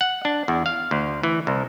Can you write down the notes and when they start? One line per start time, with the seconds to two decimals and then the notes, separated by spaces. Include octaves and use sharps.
0.01 F#5
0.25 D4
0.48 E2
0.66 F5
0.91 D2
1.23 E3
1.47 C2